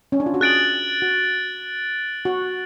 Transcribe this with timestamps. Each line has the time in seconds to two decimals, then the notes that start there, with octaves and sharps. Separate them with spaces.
0.12 C#4
0.20 D4
0.26 F4
0.34 F#4
0.41 G#4 F#6 A6 D7 F#7
1.02 F#4
2.25 F#4